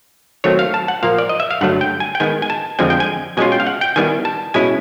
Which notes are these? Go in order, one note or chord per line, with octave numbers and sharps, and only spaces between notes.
D#3 F#3 A3 C4 C#5
F5
A5
F#5
A#2 F3 A#3 F5
D5
D#5
E5
F5
G2 D3 F#3 A3 F#5
G5
G#5
G5
D#3 G#3 B3 G#5
G#5
A5
F2 D3 F3 G#3 C4 G#5
G5
G#5
B2 G#3 C#4 F4 G#5
G5
F5
F#5
G5
D#3 G3 B3 E4 G#5
A5
B2 G#3 C#4 E4 G#5